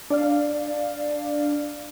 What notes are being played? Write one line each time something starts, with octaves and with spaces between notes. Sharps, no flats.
D4 D5 F5